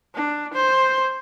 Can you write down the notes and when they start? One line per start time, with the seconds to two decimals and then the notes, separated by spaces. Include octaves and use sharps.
0.15 D4
0.54 C5